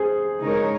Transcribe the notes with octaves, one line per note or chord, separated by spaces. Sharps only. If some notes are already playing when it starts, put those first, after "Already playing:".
Already playing: G#4 C5
C#3 G#3 D#4 A#4 C#5